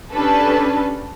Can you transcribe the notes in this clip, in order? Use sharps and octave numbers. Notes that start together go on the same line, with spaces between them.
C#4 D4 G4 A4 B4